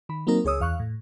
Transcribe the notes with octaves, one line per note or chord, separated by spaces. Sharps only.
D#3 B5
F#3 A#3 C4 D#4 A#4
C#2 G#4 C#5 D#6 E6
E2 F5 C#6 F#6
A2